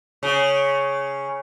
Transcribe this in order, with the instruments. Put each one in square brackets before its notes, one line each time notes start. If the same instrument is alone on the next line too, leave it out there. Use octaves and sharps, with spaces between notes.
[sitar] C#3